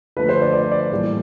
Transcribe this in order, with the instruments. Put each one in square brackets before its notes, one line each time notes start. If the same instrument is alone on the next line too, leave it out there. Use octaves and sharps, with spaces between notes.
[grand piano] D3 F3 A3 B4
C5
D5
D5
D5
A2 E3 G3 A#3